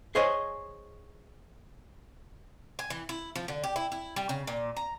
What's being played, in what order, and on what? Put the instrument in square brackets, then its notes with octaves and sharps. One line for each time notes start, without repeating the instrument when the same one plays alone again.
[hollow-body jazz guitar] G#4 C5 C#5 D#5 G#5
[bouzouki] G#5
E3
E4
F3
D3
G4
E4
E4
G3
C#3
A#2
A#5